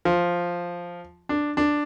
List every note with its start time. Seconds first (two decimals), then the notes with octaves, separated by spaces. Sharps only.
0.05 F3
1.29 D4
1.57 D4